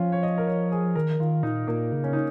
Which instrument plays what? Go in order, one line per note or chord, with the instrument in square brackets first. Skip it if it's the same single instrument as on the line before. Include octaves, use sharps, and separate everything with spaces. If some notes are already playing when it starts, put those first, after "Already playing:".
Already playing: [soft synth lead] F3 [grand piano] C#4 F4
[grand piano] C#5
D#5
A#4
C#5
G#4
[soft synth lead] D#3 [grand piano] A#4
[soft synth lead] D#3 [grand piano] F4
[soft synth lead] A#2 [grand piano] D#4
[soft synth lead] A#2 [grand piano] A#3
[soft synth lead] C#3
[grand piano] C#4
D#4